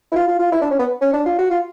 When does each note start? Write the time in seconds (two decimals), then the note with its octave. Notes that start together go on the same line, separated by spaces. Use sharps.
0.11 E4
0.15 F4
0.27 F4
0.39 F4
0.52 E4
0.61 D4
0.70 C#4
0.79 B3
1.01 C#4
1.13 D4
1.25 F4
1.38 F#4
1.50 F4